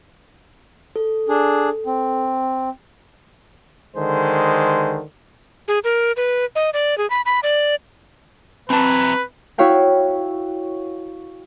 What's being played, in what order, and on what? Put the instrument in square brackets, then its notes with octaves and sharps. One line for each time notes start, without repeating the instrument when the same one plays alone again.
[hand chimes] A4
[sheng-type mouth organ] D4 G#4
C4
[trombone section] D3 D#3 G#3 C5
[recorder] G#4
A#4
B4
D#5
D5
G#4
B5
B5
D5
[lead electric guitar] E3 F#3 [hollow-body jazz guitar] C4 A5 [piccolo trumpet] B4
[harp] E4 F#4 C#5 F5 G5